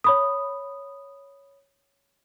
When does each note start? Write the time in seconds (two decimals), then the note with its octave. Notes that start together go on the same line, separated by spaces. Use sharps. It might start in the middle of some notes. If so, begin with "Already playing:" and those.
0.04 C#5 B5 D#6